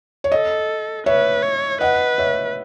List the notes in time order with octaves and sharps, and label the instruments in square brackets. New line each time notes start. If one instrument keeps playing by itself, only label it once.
[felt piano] C#5
[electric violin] A4 [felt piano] D#5
[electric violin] B4 [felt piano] C#5 E5
[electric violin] C#5
[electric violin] B4 [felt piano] D#5 F#5
[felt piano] C#5 E5